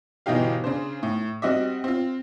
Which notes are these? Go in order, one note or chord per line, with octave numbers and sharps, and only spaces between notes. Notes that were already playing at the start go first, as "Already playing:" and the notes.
G1 B2 E3 D#4 G4 F5
C#3 D4 C5
A2
G3 C4 F#4 D#5 E5
C4 F4